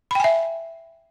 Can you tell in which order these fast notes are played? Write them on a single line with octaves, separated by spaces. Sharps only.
B5 G5 G#5 E5